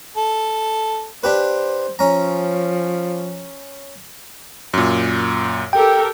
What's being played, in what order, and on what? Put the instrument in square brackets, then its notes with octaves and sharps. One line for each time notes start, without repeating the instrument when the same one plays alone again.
[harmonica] A4
[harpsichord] D4 G4 B4 [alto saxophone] C5
[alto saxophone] F3 [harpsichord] C#4 A#5
[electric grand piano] F#2 A#2
[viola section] G4 A4 A#4 [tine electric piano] G5